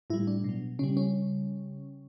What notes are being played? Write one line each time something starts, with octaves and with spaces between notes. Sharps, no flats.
A2 G3 E4
D4
B2 F#3
C#3 G3 C#4
C#4